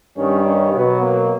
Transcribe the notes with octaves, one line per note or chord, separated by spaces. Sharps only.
G2 D#3 G3 C#4
C#4
B2 F#3 B3
A#3